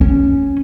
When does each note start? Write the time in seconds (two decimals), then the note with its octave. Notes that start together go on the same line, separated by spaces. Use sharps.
0.01 C#4